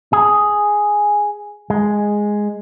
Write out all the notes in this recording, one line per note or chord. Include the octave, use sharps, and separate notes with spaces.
G#4
G#3